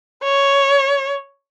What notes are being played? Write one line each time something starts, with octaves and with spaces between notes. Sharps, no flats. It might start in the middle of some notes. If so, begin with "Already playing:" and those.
C#5